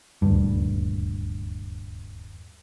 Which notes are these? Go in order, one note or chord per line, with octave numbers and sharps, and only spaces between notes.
D#1 D2 G2